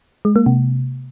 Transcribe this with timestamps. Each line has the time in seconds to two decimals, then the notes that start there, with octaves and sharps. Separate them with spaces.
0.25 G#3
0.36 A#3
0.46 C3